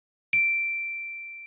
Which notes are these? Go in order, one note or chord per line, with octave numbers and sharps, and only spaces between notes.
D7